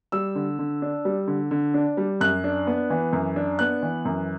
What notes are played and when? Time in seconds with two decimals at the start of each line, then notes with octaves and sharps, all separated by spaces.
0.12 G3 E6
0.35 D3
0.59 D3
0.82 D4
1.05 G3
1.27 D3
1.51 D3
1.74 D4
1.97 G3
2.21 F#2 F#6
2.44 D4
2.67 B3
2.90 E3
3.13 F#2
3.36 D4
3.59 B3 F#6
3.83 E3
4.05 F#2